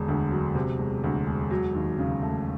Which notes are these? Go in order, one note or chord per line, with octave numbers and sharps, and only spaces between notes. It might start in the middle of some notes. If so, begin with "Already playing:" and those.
Already playing: E1 D3
D2
F#3
C3
E1
D2
E1
F#3
D#2
C#3
A3